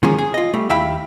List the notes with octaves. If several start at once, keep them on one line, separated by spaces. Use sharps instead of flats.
D#3 F3 G#3 A#3 C#4
G#4
F4 D#5
G3 A3
D#2 E4 E5 F5 G5 B5